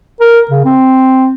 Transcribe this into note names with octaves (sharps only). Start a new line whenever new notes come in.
A#4
C#3
C4